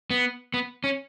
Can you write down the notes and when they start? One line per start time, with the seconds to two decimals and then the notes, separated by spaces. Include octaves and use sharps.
0.11 B3
0.54 B3
0.84 C#4